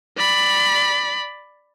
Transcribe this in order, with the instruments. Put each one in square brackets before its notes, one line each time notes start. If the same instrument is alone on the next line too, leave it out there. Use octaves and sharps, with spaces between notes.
[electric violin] D5 B5